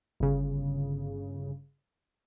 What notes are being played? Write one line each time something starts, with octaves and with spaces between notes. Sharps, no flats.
G1 C#3